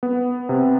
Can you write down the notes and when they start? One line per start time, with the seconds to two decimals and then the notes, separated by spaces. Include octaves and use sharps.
0.03 B3
0.49 C3